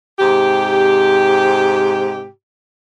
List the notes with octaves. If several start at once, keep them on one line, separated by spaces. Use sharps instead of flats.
G#2 C3 G4